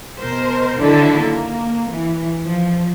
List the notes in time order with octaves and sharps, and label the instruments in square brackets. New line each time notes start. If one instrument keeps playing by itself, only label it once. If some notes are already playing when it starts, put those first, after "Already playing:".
[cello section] B2 A#4 C5
D3 D#3 F#3 D4 E4 A4
A#3
E3
F3